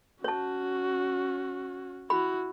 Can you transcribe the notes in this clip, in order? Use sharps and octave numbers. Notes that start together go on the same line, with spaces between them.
C#4 F#4 C#5 A5
E4 F#4 B5